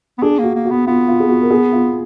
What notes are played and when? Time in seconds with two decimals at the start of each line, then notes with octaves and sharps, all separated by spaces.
0.18 B3
0.22 D4 G#4
0.39 A#3 F#4
0.54 A#3
0.65 F#4
0.70 B3
0.87 B3 F4
1.08 F4
1.20 G#4
1.29 F#4
1.41 A#4
1.51 G#4
1.72 F4